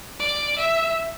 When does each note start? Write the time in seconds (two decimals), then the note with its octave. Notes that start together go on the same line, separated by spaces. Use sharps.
0.20 D5
0.58 E5